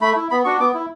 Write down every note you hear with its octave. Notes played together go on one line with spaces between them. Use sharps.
A3 B5
E4
B3 B5
D4 F#4 C#6
B3 D6
E4